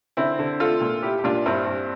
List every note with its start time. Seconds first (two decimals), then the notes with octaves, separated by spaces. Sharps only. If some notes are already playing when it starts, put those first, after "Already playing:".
0.17 D3 C4 E4
0.39 D3
0.60 A3 F4 A4
0.81 A#2
1.03 A3 E4 G4
1.19 G4
1.24 A#2 D4 F4
1.46 G2 C4 E4
1.67 G2